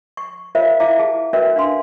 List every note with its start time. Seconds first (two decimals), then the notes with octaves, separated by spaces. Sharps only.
0.17 C#6
0.55 F4 A#4 C5 C#5 E5 F5
0.80 E4 D5 E5 F5 A#5 D6
0.99 G#4 A5
1.33 C#4 F#4 A#4 B4 D5 E5
1.56 D4 F5 C6